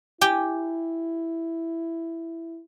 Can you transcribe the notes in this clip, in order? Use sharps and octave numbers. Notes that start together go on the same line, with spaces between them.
E4 G4 G5 G#5